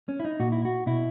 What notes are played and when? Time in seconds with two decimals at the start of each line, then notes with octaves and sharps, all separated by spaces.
0.09 C#4
0.20 E4
0.25 D#4
0.40 A#2 F#4
0.52 E4
0.65 F#4
0.86 B2 E4